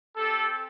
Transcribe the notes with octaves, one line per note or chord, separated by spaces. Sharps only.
C4 G4 A4